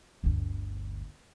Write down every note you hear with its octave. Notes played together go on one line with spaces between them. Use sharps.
G1 D2